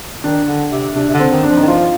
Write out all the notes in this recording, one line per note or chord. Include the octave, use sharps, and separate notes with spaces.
D#3 D4
D3
C3
C3 D4
C3
D3
C4
D#3
D4
F3
D#4
D#3
F3 F4